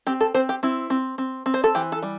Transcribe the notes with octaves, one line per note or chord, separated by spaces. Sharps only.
C4 G4
A4
C4 C5
G4
C4 E4
C4
C4
C4
C5
A4
E3 G4
A4
G3